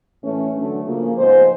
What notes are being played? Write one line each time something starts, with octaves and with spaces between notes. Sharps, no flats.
A2 E3 A3 C#4
D3 F#3 A3 D4
C#3 F3 A#3
G#2 F3 G#3 B3 C5